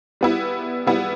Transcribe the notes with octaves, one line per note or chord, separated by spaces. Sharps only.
G3 B3 E4
G3 B3 E4